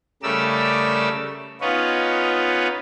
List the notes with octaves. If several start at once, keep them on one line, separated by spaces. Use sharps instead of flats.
C#3 G3 A3 A#4 D5 E6
B3 C#4 D#4 F4 B4 C#5